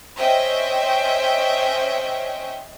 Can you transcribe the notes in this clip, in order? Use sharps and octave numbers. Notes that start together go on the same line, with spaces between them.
C#4 C5 D#5 E5 G5